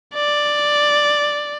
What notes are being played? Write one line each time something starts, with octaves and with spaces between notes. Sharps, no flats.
D5